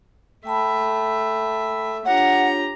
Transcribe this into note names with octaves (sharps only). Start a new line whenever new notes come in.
A3 E5 G5 A5 B5
D4 F4 G4 C#5 F#5 A#5